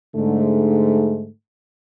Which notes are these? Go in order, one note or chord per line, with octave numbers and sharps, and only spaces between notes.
G#2 D3 A3